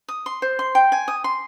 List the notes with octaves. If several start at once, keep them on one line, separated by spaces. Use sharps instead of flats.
D#6
C6
C5
C6
G5
G#5
D#6
C6